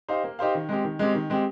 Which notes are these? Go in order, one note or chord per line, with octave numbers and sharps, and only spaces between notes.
D#4 G4 C5 F5
A#3
D#4 G4 C5 F5
D#3
G#3 C4 G4
D#3
G#3 C4 G4
D#3
G#3 C4 G4